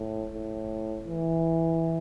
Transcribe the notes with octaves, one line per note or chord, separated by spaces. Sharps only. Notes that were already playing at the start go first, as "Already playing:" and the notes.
Already playing: A2
A2
E3